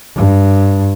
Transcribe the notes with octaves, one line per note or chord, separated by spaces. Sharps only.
G2